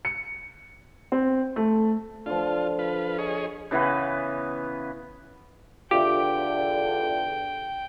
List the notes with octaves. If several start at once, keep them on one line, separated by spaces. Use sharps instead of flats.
C#7
C4
A3
D3 F3 F4
F4 B4
G#4 C#5 D#5
C#3 E3 B3 B4
E2 D3 F4 G4 E5 G5